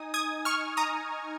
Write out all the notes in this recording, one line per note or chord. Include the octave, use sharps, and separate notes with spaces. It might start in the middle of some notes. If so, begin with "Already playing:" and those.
Already playing: D#4 G#5 D#6
D#6 G#6
C#6 F6
A#5 D#6